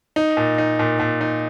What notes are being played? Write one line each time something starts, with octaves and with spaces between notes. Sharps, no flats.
D#4
A#2
D#4
A#2
A#2
D#4